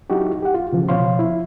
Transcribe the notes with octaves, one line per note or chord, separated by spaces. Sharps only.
F#3 D#4 E4 F#4 G4
G4 F#5
F4
C#3 E3 F3
B2 F3 C#5 F5 C6
E4